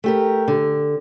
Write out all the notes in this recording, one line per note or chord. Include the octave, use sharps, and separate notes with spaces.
A3 G4 A#4
D3